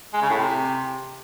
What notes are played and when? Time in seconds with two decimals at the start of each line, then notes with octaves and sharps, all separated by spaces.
0.13 G#3
0.22 C#3
0.30 A2
0.38 C3